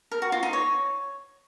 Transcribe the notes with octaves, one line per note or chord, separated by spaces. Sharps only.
A#4
F#4
F4
D#4
C#5